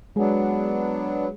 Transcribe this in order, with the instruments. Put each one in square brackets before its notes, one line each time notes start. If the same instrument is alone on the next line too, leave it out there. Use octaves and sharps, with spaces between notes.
[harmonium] F#3 B3 D4 [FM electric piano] G#3 G#4